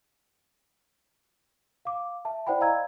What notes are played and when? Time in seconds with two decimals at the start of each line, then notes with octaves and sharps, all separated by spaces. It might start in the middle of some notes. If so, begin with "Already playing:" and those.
1.85 F5 D6
2.25 E5 A5
2.47 E4 C5 D5 F#5 G5 B5
2.60 D5 D#5 F5 A#5 E6 G#6